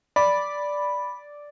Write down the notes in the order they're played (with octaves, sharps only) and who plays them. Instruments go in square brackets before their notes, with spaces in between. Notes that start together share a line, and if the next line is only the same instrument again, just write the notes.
[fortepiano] D5 [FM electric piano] B5